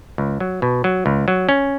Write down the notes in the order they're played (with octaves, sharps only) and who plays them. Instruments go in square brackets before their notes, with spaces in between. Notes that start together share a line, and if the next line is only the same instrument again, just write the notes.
[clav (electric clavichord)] C#2
F#3
B2
F#3
C#2
F#3
C#4